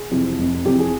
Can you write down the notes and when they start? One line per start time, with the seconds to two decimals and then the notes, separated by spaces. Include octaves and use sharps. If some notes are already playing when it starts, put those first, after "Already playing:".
Already playing: G#4
0.11 F2 C3 E3
0.38 F1
0.65 F2 C3 E3 G4
0.79 G#4